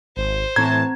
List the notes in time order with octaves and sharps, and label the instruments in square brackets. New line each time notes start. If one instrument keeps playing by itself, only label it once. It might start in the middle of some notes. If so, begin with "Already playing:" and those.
[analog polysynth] G#1 [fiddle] C5
[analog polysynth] A2 E3 A5 [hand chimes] C4 A#5 [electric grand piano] G#6